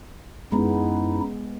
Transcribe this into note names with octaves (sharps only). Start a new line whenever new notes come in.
F#2 G#3 B3 D#4 E4